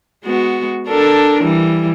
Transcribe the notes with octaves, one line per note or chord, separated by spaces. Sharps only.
G#3 B3 F#4
D4 A4 A#4
E3 G3